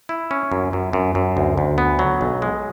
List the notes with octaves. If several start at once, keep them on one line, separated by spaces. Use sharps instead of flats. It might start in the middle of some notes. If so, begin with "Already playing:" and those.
E4
C#4
F#2
F#2
F#2
F#2
D2
D2
B3
F#3
B1
G#3